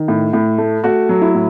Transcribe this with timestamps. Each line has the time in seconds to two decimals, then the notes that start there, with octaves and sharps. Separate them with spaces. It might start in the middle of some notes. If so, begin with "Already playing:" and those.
Already playing: D#3
0.08 A2
0.33 A2
0.58 A3
0.84 A3 F#4
1.09 F#3
1.22 E4
1.34 A2